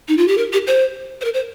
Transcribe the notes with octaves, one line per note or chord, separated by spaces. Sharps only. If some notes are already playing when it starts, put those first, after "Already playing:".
D#4
F4
G4
A#4
G4
C5
C5
A#4
C5